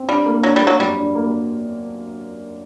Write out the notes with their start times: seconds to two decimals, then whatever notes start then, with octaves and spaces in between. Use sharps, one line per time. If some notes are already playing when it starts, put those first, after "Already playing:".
Already playing: C4
0.09 G3 D4
0.26 A#3
0.43 F#3 D4
0.56 G3
0.61 A#3
0.67 F#3
0.79 F#2 G3
0.98 D4
1.15 A#3